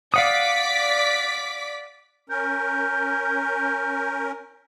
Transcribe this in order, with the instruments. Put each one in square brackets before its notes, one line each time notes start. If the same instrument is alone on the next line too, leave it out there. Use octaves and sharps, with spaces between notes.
[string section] D5 D6 B6 [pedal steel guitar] F5 F#5 D#6
[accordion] C#4 A#4 [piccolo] G6